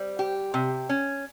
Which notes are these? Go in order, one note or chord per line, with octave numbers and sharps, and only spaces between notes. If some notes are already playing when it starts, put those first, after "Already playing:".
Already playing: G3 C4
G4
C3
C#4